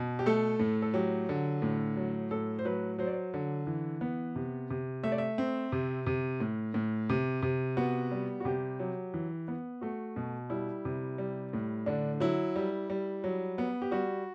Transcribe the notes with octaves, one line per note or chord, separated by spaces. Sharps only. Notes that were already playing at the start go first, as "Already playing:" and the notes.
Already playing: B2
G4
A3 A4
A2
A4
F#3 G4
D3
A2
F#3
A2 A4
C5
F#3 B4
F#3 C5
D5
C5
D3
E3
B3
C3
C3
A3 E5
D5
E5
C4
C3
C3
A2
A2
C3
C3
B3 F#4
G3
F#4
C3 G4
F#3
E3
B3
A3 F#4
B2
G3 E4
C3
G3
A2
D3 D4
F#3 E4
G3
G3
F#3
B3
G4
G3 F#4